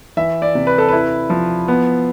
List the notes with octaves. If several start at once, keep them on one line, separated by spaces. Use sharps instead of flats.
E3 E5
D5
C3
B4
A4
E4 B4
F3
B3